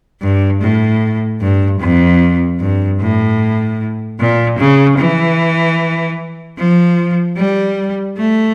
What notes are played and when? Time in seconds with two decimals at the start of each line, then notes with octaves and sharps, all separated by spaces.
0.21 G2
0.61 A2
1.40 G2
1.80 F2
2.59 G2
3.00 A2
4.19 A#2
4.59 C#3
4.98 E3
6.58 F3
7.37 G3
8.17 A3